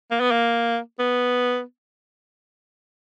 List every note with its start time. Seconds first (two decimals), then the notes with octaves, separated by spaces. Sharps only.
0.11 A#3
0.20 B3
0.31 A#3
0.99 B3